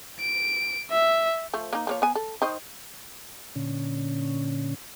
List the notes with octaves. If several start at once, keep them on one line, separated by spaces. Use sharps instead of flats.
D7
E5
F3 A3
A#3 D#4
F3 A#3 C#5
B3 G#5
A4
D#3 C5 D#5
A#2 D3 C#4